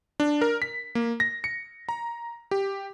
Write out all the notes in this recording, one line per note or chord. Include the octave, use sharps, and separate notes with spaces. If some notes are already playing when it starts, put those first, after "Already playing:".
D4
A#4
B6
A#3
A#6
C#7
A#5
G4